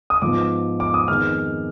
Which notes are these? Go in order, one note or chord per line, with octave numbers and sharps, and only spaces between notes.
D#6
G#2 F3 B3 D6
D6
D#6
F2 D#3 G#3 B3 F6